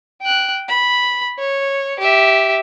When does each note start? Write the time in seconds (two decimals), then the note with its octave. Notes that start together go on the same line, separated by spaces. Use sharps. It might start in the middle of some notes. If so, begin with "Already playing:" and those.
0.22 G5 F#6
0.68 B5
1.38 C#5
1.99 G4 E5